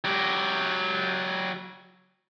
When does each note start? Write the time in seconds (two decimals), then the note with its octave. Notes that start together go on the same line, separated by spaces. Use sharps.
0.04 F#3 G4